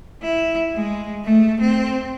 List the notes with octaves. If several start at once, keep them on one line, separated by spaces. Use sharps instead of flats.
E4
G#3
A3
C4